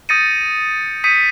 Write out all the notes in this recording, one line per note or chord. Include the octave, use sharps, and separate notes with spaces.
D#6 G6 A6 A#6 C#7 D#7
D#6 G6 B6 C#7 D#7